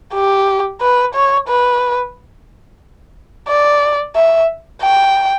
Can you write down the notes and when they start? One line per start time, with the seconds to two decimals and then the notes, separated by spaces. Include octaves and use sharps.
0.14 G4
0.81 B4
1.14 C#5
1.48 B4
3.48 D5
4.16 E5
4.82 G5